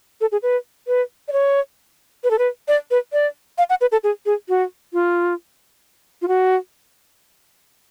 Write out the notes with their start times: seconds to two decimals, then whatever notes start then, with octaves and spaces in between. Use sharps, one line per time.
0.21 A4
0.32 G#4
0.43 B4
0.88 B4
1.28 D5
1.33 C#5
2.24 B4
2.31 A4
2.39 B4
2.68 D5
2.91 B4
3.13 D5
3.58 F5
3.70 F#5
3.81 B4
3.92 A4
4.04 G#4
4.26 G#4
4.49 F#4
4.93 F4
6.22 F4
6.28 F#4